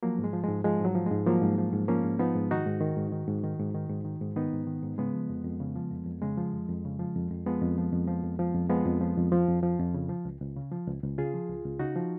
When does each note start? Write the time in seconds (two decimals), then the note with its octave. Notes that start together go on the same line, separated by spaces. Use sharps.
0.03 F3 F#3 A#3
0.19 G#2
0.24 G#3
0.33 F3
0.44 G#2 G#3
0.64 F3 G#3
0.80 G#2 F#3
0.95 F3
1.06 G#2 G#3
1.26 F3 F#3 A#3
1.42 G#2
1.58 F3
1.73 G#2
1.88 F3 A#3 C#4
2.04 G#2
2.19 F3 B3 D#4
2.35 G#2
2.51 D#3 D#4 F#4
2.66 G#2
2.81 D#3
2.97 G#2
3.12 D#3
3.28 G#2
3.44 D#3
3.60 G#2
3.74 D#3
3.89 G#2
4.05 D#3
4.21 G#2
4.36 D#3 B3 D#4
4.53 G#2
4.67 D#3
4.83 G#2
4.98 C#3 G#3 B3
5.14 F3
5.29 F2
5.44 F2
5.60 C#3
5.76 F3
5.92 F2
6.06 F2
6.22 C#3 G#3
6.38 F3
6.53 F2
6.69 F2
6.85 C#3
6.99 F3
7.16 F2
7.31 F2
7.46 F3 G#3 B3
7.62 F2
7.78 F3
7.92 F2
8.08 F3
8.24 F2
8.39 F3
8.54 F2
8.70 F3 G#3 B3
8.85 F2
9.01 F3
9.17 F2
9.32 F3
9.48 F2
9.63 F3
9.79 F2
9.94 C#3
10.09 F3
10.25 C#2
10.41 C#2
10.56 C#3
10.72 F3
10.88 C#2
11.03 C#2
11.18 C#3 F4 G#4
11.34 F3
11.50 C#2
11.64 C#2
11.79 C#3 D#4 F#4
11.96 F3